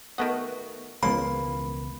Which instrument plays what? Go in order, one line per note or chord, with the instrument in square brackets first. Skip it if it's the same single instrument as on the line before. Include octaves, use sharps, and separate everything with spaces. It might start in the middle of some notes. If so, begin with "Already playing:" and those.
[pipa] D#3 A3 F#4 [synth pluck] B3 D#5
[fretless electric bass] E1 C#2 B3 [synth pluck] C#3 F3 G#3 [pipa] A#3 [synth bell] B5